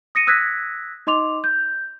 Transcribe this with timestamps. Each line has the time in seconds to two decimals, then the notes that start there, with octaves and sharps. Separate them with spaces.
0.15 D#6 A#6 C#7 D#7
0.27 D#6 E6 F#6 G#6 A#6 B6
1.07 D#4 D#5 C6 D6 F7
1.44 G6